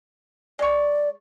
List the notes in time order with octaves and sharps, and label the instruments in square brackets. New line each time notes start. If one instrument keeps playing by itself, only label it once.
[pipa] G#3 C#6 [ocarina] D5